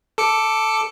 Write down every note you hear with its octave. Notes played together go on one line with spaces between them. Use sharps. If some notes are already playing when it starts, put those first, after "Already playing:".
A4 D6 C#7